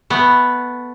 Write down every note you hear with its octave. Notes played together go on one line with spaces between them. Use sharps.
A3 B3